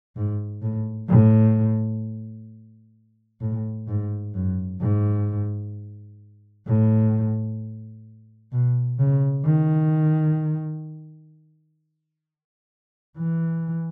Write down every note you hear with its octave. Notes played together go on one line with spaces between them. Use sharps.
G#2
A2
A2
A2
G#2
F#2
G#2
A2
B2
C#3
D#3
E3